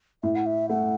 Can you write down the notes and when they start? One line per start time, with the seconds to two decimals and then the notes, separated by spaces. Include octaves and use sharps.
0.23 A2 E5
0.36 F#5
0.46 E5
0.69 A3 F#5